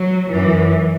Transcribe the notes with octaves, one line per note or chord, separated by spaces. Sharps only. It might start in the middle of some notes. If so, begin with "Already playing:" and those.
Already playing: F#3
F#2 E3